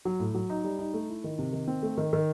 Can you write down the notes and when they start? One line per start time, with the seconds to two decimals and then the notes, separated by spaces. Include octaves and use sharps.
0.05 F#3
0.20 A2
0.35 F#3
0.50 D#4
0.64 G3
0.79 D#4
0.94 A3
1.09 E4
1.24 D#3
1.39 C3
1.53 D#3
1.68 C4
1.83 A3
1.98 D#3
2.13 D#3